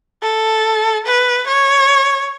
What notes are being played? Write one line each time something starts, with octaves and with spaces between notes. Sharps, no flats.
A4
B4
C#5